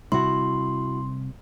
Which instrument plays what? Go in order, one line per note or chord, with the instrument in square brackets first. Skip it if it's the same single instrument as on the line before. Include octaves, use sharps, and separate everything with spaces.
[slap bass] C3 G3 C4 [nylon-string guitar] E4 F#4 [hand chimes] C6